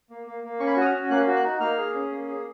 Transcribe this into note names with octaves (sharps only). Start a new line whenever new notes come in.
A#3
A#3
A#3
C#4 C#6
B5
C#6
F#4 D#6
F6
C#4
A#3 F#6
F#4
F#6
D#4
A#3 F6
G#4
C#4
A#3
G#4